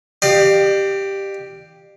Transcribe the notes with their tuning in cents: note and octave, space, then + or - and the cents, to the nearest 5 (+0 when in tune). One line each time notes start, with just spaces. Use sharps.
G4 +0 D5 +45 F5 +0